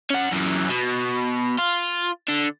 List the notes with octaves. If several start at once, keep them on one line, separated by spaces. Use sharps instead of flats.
C#4 F#5
F#2 E3
B2
F4
D3